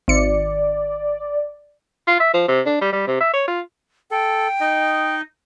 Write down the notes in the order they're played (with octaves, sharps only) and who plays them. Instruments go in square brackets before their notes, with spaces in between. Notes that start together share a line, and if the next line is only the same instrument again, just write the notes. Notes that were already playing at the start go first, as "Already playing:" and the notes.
[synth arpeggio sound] G#1 C#7 [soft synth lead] D5
[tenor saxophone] F4
E5
F3
C3
D4
G3
G3
C3
E5
C#5
F4
[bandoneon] A4 [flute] G5
[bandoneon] D#4 D#5